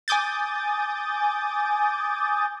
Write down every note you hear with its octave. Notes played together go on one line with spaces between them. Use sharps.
G#5 D6 D#6 G6 A6